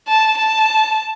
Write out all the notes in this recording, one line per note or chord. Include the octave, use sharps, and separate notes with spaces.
A5
A5